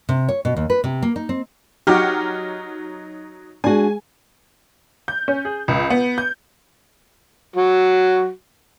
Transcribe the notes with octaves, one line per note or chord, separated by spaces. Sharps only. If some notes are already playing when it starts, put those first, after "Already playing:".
C3
C#5
B2
D#2
B4
C3
A#3
D#4
C4
F#3 D#4 F#4 G4 F6
G#3 D4 F#4 G#4 G#5
G6
C#4
G#4
C#2
B3
G6
F#3 F#4